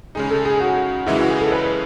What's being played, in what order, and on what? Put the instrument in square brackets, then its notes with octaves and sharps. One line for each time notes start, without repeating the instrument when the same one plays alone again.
[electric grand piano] C#3 G#3 D#4 [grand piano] G#4
[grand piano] A4
G#4
F#4
[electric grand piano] F#2 C#3 E3 G#3 [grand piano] E4
[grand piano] F#4
G#4
A4
B4